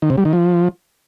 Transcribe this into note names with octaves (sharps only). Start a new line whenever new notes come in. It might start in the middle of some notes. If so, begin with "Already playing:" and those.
D#3
C3
G3
D#3
F3